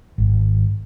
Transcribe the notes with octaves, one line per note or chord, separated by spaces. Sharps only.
G#1